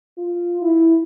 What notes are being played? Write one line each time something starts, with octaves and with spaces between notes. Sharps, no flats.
F4
E4